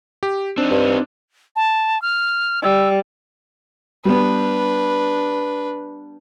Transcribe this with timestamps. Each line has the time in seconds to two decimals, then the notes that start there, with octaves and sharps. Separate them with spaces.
0.23 G4
0.58 C4 D4 D#4
0.71 G2
1.56 A5
2.02 F6
2.63 G3 E6
4.05 G3 B3 D4 B4